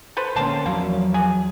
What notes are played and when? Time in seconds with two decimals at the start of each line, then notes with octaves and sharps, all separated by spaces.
0.17 A4 B4 C5
0.36 D3 A#3 C4 C#4 A5 C6
0.66 E2 F3 F#3 A#3
1.14 G#4